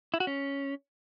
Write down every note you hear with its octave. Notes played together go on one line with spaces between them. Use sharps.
E4
F#4
C#4